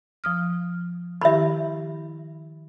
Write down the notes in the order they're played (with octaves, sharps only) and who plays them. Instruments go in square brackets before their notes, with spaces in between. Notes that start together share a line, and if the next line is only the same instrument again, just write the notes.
[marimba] F3 D#6 F6
[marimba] D#3 E4 G4 [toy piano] E5 B5